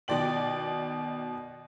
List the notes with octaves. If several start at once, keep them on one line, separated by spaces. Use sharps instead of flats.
B2 D#3 D5 G5 F#7